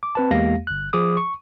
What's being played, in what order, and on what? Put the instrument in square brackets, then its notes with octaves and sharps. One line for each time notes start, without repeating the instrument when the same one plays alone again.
[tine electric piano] D6
C4 B4 A5
E2 G#3 A#3 G4 F5 A#6
G1 F#6
F3 G#4 D6 D#6
C#6